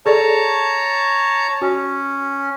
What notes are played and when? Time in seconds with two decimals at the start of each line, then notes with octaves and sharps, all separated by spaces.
0.06 G#4 A4 C#5 D5 A5 A#5
1.62 C#4 F#4